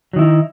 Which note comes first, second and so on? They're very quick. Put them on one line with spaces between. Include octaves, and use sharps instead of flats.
F#3 D#3 E4 D#4